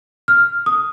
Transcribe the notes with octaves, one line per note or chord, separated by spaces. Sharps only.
F6
D#6